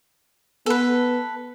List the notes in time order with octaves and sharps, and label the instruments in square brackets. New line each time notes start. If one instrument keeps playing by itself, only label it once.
[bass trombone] B3 [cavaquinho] A4 B4